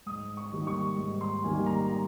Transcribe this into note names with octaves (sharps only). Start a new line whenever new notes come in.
G#2 D#6
C#6
D#3 G3 A#3
C#6
G#2
C6
D#3 G3 A#3 G#5
A#5
A#5